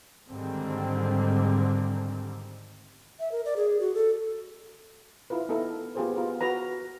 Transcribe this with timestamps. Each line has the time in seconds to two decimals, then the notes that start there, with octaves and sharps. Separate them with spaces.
0.29 G#2 D3 D#3 G3 C4
3.20 E5
3.32 A#4
3.45 D5
3.57 G#4
3.80 F#4
3.94 A4
5.30 E4 F4 A#4 B4
5.49 B3 D#4 E4 A4 A#4
5.95 B3 F4 G4 G#4 A#4 C5
6.16 B3 F4 A#4
6.41 F#4 A#4 B4 A#5